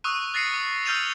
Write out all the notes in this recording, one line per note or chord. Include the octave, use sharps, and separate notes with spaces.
C#6 D#6 E6 F#6 D#7
F#6 A6 A#6 C7 C#7 D#7
D#6
E6 F6 G6 A6 D#7 F7